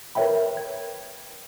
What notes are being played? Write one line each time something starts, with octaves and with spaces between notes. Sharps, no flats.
A#4 B4 C#5 E5 G5 B5
G#6